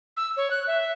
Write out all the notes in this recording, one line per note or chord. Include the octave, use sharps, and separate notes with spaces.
E6
C#5
F#6
E5